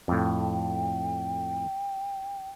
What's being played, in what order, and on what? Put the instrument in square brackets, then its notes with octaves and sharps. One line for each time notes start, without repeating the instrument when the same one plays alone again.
[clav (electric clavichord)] F2 A2 [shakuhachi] G5